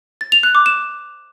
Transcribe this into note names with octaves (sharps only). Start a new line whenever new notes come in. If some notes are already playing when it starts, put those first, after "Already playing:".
A6
F7
F#6
D6
E7